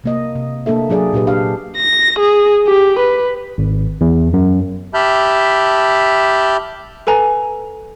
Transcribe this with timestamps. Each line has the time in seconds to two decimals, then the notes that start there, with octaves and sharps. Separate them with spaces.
0.04 C3 A#3 D#5
0.36 C3
0.66 A#3 D4 A4 E5
0.90 F#3 D4 G#4 D5
1.13 A#2 D4 G4 B4
1.27 D4 G4 F5
1.76 A#6
2.19 G#4
2.67 G4
2.99 B4
3.58 G#1
4.01 E2
4.34 F#2
4.94 G4 E5 A5 B5 F6 G6
7.07 A4 B4 G#5 A#5